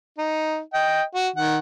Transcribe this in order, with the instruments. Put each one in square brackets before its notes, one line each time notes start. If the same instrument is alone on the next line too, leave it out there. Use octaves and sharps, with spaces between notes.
[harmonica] D#4
D#5 G5
F#4
D#3 F#5